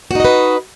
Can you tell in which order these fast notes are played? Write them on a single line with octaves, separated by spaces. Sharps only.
F#4 D#4 D#5 B4